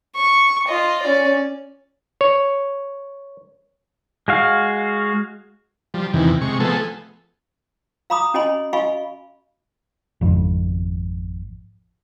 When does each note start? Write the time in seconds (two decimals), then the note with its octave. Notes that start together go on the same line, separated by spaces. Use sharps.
0.16 C#6
0.68 F4 D#5
1.03 C#4 D5
2.21 C#5
4.28 G#3 F#4 F5
5.94 F3 G3
6.13 E2 C3 D#3 E3
6.41 C3 G#3 C#6
6.60 F3 A3 B3 G#4 A4
8.10 F5 A#5 B5 D6 D#6
8.34 C#4 F#4 D#5 G#5 B5 C6
8.73 F#4 D#5 F5 G#5 B5 C#6
10.21 G#1 F2